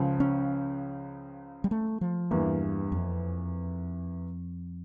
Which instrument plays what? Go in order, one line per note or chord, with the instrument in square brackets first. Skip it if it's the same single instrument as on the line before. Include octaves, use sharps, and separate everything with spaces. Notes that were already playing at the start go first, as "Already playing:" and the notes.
Already playing: [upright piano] C#2 C#3 F3
[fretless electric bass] C#4
G3
A3
F3
[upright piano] E2 E3 A#3 [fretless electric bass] G2
[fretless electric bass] F2